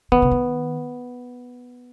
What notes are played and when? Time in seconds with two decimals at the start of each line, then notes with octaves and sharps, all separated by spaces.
0.12 D#3 B3
0.22 C#3
0.31 D#3